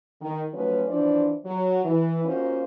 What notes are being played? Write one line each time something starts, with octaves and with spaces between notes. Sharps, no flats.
D#3
F3 F#3 A3 C#4 D#4 B4
E3 F3 D4 C5 D5
F#3
E3
A#3 C#4 D#4 F4 F#4 C5